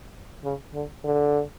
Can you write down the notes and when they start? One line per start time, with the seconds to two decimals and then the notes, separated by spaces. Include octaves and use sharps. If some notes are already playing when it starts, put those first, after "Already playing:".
0.44 C#3
0.74 D3
1.04 D3